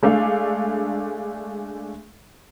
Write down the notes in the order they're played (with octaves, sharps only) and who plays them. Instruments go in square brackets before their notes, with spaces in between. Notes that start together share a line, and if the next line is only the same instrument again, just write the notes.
[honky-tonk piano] G#3 A3 D4 F5